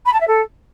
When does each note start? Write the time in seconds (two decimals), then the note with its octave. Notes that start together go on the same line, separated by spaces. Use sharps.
0.05 B5
0.13 A5
0.20 E5
0.27 A4